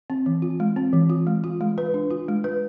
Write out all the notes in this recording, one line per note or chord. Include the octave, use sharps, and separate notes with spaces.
C4
E3
F4
G#3
C4
E3
F4
G#3
F4
G#3
B4
D4
F4
G#3
B4